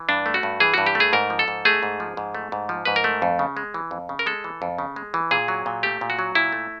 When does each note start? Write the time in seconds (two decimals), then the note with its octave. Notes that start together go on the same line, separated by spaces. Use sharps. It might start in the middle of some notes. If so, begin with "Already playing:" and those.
Already playing: E3
0.09 G2 D4
0.26 A3
0.34 F#4
0.43 G2
0.60 E3 G#4
0.74 G2 F#4
0.87 G4
0.95 A3
1.00 G#4
1.13 G#2 A#4
1.30 F3
1.39 A4
1.48 G#2
1.65 A3 G#4
1.83 G#2
2.00 F3
2.17 G#2
2.35 A3
2.52 G#2
2.69 F3
2.85 G#2 B4
2.96 A#4
3.04 A3
3.22 F2
3.39 C#3
3.57 G#3
3.74 E3
3.91 F2
4.09 C#3
4.19 A#4
4.26 G#3 A4
4.44 E3
4.62 F2
4.78 C#3
4.96 G#3
5.14 E3
5.31 A#2 G#4
5.48 F#3
5.66 A#2
5.83 A3 G4
6.01 A#2
6.10 F#4
6.19 F#3
6.35 A#2 E4
6.52 A3